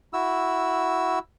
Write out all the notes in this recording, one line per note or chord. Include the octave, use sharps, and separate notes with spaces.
E4 F#4 E6